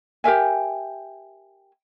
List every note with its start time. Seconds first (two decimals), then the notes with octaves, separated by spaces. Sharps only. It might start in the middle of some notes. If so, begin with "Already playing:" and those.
0.24 G4 A#4 E5 G#5